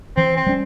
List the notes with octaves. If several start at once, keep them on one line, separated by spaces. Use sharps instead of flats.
E3 C4
C4
G3 C#4